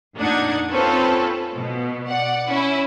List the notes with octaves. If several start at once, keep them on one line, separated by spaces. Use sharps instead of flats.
F2 A#2 D4 D#4 F#5 G#6
C4 C#4 F4 A4 B4 C5
B2
D5 F#5
C#4 E4